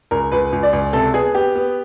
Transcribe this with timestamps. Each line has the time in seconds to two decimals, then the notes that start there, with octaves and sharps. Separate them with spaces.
0.11 C#2 A#4
0.32 C#2 B4
0.52 C#2
0.63 D5
0.73 C#2
0.93 C3 A4
1.14 B3 G#4
1.35 B3 G4
1.55 B3